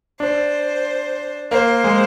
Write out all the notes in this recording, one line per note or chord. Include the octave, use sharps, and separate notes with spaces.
D4 C5
A#3 C5
G#3